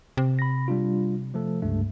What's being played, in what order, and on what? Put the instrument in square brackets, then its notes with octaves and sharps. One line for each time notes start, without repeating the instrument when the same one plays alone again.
[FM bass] C3
[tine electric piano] B5 A#6
G3 D4 F4
F3 A3 A4
C#2 G2 A3